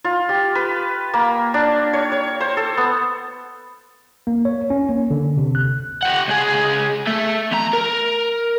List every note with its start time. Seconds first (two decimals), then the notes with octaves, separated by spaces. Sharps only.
0.04 F4
0.29 G4
0.55 B4
1.14 A#3
1.54 D4
1.93 C#5
2.12 C#5
2.40 C5
2.57 A4
2.77 B3
4.27 A#3
4.45 C#5
4.70 C#4
4.89 A#3
5.11 D3
5.37 C3
5.55 F#6
6.03 G4 F#5
6.28 C#2 G#4
7.07 A3 E5
7.51 E2 A#5
7.73 A#4